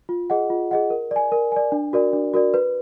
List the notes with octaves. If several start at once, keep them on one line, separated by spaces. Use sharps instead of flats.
F4
G#4 D#5 F#5
F4
G#4 D#5 F#5
A#4
D5 G#5
A#4
D5 G#5
D4
F#4 A#4 D5
D4
F#4 A#4 D5
B4